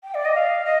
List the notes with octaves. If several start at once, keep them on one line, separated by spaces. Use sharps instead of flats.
G5
D5
D#5
F5
D#5